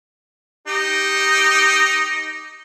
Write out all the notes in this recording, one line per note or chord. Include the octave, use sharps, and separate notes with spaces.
D#4 G4